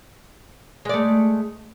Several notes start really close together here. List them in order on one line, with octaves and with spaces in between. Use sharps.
G#3 D5 A3